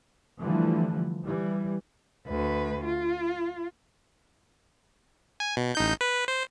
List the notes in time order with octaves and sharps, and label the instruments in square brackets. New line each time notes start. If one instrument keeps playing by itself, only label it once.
[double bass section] D3 E3 F3 G3 A3
E3 G3
[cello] D2 B4
F4
[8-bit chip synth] G#5
B2
A1 D#4 G6
B4
C5